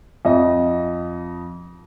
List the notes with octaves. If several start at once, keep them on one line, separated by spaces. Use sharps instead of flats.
F2 D#5